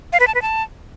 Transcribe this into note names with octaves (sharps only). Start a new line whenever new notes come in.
F5
B4
A5
B4
A5